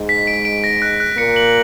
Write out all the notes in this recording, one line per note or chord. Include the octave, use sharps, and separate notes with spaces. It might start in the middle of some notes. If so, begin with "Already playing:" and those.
Already playing: G#2 G#3
B6
D7
D7
A#6
F#6
F#6
A#2 A#3 C#7
F#7